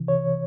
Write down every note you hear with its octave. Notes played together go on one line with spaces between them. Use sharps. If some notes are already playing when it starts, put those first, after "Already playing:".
Already playing: C2 C3 E3
C#5